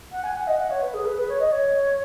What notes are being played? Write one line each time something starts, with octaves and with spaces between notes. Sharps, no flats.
F#5
G#5
F#5
D#5
F#5
C#5
B4
G#4
B4
B4
C#5
D#5
C#5